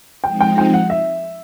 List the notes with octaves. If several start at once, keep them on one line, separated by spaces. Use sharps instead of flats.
F3 G#3 C4 D#4 G5
G5
G5
F#5
E5